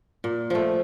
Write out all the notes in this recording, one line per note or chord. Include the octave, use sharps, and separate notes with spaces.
A#2
F3 A3